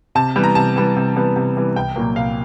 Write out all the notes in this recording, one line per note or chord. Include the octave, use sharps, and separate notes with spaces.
C3 A5
E3 G3 B3
A#5
C3 A5
E3 G3 B3
C3
E3 G3 B3
C3
E3 G3 B3
C2 G5
A#2 F#3 A#3
C2 F5